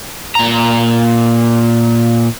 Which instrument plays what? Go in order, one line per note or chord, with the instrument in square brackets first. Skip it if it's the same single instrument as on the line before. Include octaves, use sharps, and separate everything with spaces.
[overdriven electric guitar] A#2 A#5